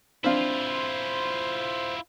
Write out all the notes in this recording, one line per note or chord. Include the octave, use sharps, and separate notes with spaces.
C4 D4 E4 F4 C5 F5